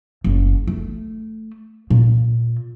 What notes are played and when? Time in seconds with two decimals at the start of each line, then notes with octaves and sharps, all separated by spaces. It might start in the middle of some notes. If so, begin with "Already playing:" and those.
0.24 F#1
0.68 A3
1.90 A#2